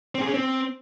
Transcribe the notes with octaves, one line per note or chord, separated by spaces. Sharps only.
C4
G#4
C#4
C4